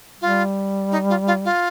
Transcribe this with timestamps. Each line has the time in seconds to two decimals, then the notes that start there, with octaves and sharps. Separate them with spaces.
0.21 G3 F4
0.91 D#4
1.09 F4
1.27 F4
1.45 F4